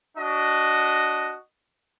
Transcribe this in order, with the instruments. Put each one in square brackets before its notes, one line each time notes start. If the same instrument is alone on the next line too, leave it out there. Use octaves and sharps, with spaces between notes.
[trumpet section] D4 F#4 D#5